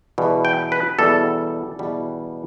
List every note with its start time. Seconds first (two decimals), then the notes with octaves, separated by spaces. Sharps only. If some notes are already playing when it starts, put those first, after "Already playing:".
0.18 E2 B2 G3
0.45 G5
0.72 B4
0.99 E2 B2 G3 A4
1.79 E2 B2 G3